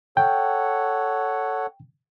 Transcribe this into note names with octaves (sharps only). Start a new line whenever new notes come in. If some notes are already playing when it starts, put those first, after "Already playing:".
A4 C#5 F#5 G5